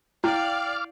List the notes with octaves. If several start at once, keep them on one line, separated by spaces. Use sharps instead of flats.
E4 D5 F5 G5 D6 F6